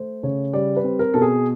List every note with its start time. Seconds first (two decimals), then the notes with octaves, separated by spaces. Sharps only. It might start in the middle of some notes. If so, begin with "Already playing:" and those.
Already playing: A3 C5
0.23 C#3 C#5
0.53 G3 D5
0.77 B4
0.84 C4
0.99 A#4
1.14 B2 A4
1.22 G#4